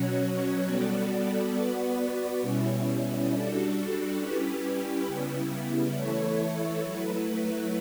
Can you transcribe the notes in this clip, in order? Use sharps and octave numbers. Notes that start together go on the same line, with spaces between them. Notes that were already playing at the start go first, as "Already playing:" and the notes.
Already playing: B2 F#3 C#4 F#4 C#5
G3 B3 F#4 A4 D5
B3 F#4 B4 D5
B2 G3 C#4 E4
G3 D4 F#4 A4
G3 C#4 E4 G4 B4
C#3 G3 B3 E4
E3 A3 E4 A4 C#5
F#3 A3 E4 B4